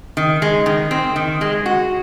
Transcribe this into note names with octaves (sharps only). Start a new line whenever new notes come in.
D#3
G#3
D#3
C4
D#3
G#3
F#4